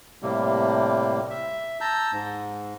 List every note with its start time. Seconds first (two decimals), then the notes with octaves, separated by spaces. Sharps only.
0.22 A2 C3 G3 A#3
1.30 E5
1.81 A5 A#5 E6 G6
2.12 G#2